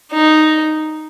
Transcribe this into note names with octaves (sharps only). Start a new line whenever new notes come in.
D#4